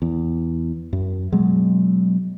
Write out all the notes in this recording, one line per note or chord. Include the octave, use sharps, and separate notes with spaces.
E2
F#2
B2 F#3 G#3